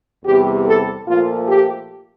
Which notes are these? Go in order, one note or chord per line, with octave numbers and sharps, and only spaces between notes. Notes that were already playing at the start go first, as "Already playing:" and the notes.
E2 C3 G3 G4
A4
A#2 F3 A3 F4
G4